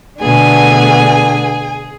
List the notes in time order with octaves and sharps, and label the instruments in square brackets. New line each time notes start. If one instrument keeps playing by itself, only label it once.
[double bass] B2 D3 [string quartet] A3 B3 D4 [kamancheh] G#4 [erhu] G#5